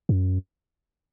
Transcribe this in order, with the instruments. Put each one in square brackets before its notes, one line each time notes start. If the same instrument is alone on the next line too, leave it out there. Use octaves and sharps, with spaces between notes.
[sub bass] F#2